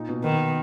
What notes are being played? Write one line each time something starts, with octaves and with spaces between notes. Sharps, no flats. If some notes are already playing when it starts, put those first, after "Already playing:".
Already playing: A#2 D#4
B2
D#3 B3